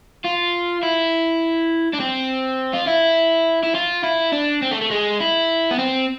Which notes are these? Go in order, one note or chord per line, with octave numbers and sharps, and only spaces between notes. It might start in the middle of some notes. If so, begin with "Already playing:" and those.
F4
E4
D4
C4
F4
E4
E4
F4
E4
D4
C4
A3
A3
G#3
E4
B3
C4